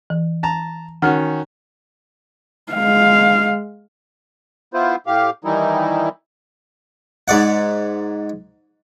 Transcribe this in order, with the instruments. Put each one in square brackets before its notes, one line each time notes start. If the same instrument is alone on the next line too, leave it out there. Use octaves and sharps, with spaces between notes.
[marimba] E3
[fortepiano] A5 A#5
[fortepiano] D#3 C#4 F#4 [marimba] F#5 F6
[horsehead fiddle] G#3 F5
[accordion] B3 E4 F4 C5
A2 G4 F5
D#3 E3 G3 D#4 E4
[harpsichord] G#2 D5 F#5